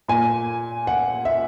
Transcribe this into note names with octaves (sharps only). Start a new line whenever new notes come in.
A#2 G#5
F#5
E5